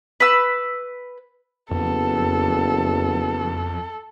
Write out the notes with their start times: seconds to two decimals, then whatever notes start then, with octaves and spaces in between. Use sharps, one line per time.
0.20 B4 E6
1.71 F#1 F2 B3 A4